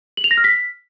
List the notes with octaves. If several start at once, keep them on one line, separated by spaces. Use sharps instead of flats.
F#7
F7
A#6
F6
B6